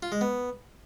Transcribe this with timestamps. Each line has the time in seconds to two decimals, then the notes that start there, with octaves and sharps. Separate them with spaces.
0.02 F4
0.12 G#3
0.21 B3